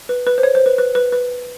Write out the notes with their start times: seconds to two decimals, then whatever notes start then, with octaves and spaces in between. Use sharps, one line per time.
0.09 B4
0.27 B4
0.38 C5
0.43 C#5
0.55 C5
0.66 B4
0.78 B4
0.95 B4
1.12 B4